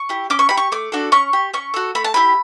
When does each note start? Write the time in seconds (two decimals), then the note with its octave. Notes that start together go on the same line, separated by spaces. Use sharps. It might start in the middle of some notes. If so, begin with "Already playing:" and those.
Already playing: C#6
0.09 E4 G4
0.30 C#4 D6
0.39 C#6
0.49 G4 B5
0.57 C#6
0.72 A3 D6
0.92 D4 F#4 A4
1.12 C#4 C#6
1.33 G4
1.54 C#4 C#6
1.74 F#4 A4
1.95 A3 B5
2.04 A5
2.14 E4 G4 B5